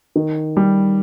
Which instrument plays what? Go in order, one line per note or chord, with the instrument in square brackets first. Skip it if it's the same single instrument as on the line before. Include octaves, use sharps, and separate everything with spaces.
[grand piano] D#3
G3